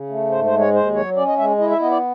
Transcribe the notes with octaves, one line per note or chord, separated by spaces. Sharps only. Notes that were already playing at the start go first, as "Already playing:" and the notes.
Already playing: C#3
A3
G#2 C5
C5
G#3
C#5
D#2 C5
F#3 C#5
C#4 D5
D#5
G#3 E5
E4 D#5
E5
B3 D#5
D5